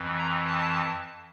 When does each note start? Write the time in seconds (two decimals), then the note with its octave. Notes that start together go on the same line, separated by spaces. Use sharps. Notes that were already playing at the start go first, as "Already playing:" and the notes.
Already playing: F2 E3
0.18 A#5
0.47 A5